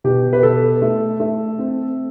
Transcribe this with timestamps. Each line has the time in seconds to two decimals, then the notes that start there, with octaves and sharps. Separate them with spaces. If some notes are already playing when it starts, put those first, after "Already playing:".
0.04 B2 G4
0.33 B4
0.43 B2 A4
0.82 A3
1.20 A3
1.58 C4